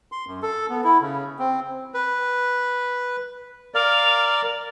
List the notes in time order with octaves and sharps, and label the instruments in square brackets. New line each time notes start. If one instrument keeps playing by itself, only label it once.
[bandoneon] C6
F#2
A4
B3
E4
C#3
C4
B4
[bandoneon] A#4 D5 [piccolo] F5